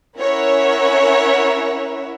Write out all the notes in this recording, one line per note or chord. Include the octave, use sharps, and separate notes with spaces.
C#4 E4 A#4 C#5 E5 F#5